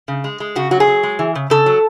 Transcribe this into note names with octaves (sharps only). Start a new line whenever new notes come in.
C#3
G#3
G#3
C#3 F#4
F#3 F#4
G#4
F#3
G#3
E3
C#3
C#3 A4
F#3